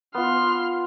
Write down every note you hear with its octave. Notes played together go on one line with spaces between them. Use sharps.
B3 F4 C6 F6